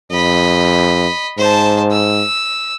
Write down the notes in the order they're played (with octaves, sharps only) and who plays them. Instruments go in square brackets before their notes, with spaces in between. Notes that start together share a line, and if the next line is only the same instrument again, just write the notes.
[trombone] F2 [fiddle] D#5 B5
[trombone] G#2 [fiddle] C5 A5
[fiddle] E6